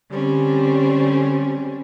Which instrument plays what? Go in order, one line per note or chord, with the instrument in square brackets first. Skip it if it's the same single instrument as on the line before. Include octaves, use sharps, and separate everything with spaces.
[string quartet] D3 G3 C4 C#4